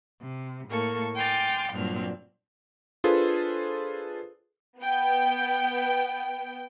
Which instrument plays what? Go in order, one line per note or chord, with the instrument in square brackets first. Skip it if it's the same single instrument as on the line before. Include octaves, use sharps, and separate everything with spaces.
[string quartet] C3
A2 A#3 A4 C#6
G5 G#5 C6 D6 F6 A6
G2 A#2 F#3 C4 D4 F6
[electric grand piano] D4 F4 G#4 A4 B4 C5
[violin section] B3 G5